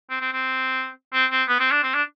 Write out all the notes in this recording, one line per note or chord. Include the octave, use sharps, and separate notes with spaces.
C4
C4
C4
C4
C4
B3
C4
D4
C4
D4